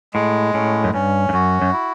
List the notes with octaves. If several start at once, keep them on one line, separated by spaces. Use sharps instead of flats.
A2 G#3
A2 C#4
F#2
G2 C#4
G2
F#2 F#4
F#2
E4